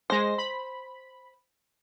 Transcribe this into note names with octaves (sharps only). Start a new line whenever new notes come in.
G#3 C5 A#6
B5